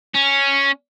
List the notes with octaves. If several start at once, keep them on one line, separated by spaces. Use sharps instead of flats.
C#4